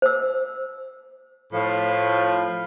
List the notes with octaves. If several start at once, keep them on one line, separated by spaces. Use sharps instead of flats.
C5 E6
A2 F3